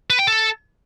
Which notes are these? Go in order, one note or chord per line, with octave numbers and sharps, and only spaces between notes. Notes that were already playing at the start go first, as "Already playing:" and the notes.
B4
G5
A4